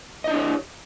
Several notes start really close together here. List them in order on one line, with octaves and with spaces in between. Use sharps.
D#5 E4 D4 G4 C#5